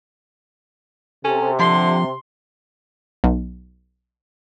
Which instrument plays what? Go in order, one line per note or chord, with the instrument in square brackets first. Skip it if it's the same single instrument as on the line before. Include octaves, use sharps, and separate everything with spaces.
[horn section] C3 [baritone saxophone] C#4 [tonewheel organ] A4
[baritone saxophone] D3 [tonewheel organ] F3 [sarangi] C6
[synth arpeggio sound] B1